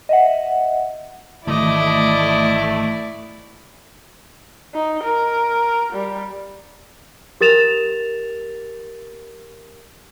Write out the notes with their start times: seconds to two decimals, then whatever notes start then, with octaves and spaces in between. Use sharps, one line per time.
0.09 D#5 E5 F#5
1.47 G#1 D#3 E3 A3 E4 D5 D#5 D6
4.74 D#4
5.04 A#4
5.93 G3
7.41 G4 A#4 A6 E7 F7